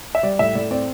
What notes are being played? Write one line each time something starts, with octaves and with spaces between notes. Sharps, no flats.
E5
G3 D5
A2 E5
A2 D5
C4 D5